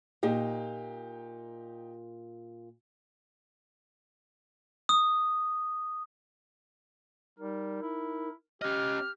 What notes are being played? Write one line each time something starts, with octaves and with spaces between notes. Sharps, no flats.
A#2 D#4 G4
D#6
G3 D#4 A#4
E4
C#4 G4 D#5 F6 F#6